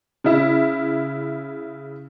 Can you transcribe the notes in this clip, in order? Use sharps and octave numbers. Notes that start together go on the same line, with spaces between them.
C#3 E4